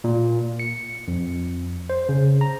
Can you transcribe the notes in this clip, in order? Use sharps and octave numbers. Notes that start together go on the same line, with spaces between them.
A#2
C#7
F2
C5
C#3
A#5